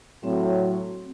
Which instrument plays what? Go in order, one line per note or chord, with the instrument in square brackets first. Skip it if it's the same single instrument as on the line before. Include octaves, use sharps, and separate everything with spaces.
[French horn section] A2 F#3 [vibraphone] C4